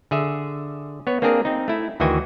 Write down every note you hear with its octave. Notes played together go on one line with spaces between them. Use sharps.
D3 G#4 E5
B3 C#5
A#3 C4 D4 G#4 A#4
C4 D#4
A3 E4
D2 D#3 E3 F#4 G5 G#5